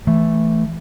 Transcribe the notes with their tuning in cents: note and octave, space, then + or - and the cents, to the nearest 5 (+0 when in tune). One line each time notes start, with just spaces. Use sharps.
E3 +0 A3 +0